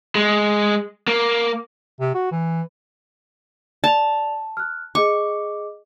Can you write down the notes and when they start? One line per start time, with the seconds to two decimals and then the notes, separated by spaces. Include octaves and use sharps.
0.15 G#3
1.08 A#3
2.00 C3
2.14 F#4
2.32 E3
3.84 D5 A5 F7
4.57 F6 F#6
4.95 G#4 D#5 C#6 D6